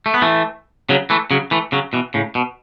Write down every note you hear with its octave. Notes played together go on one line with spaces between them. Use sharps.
A3
B3
E3 A3
C#3 F#3
E3 A3
C#3 F#3
E3 A3
C#3 F#3
B2 E3
A2 C#3
B2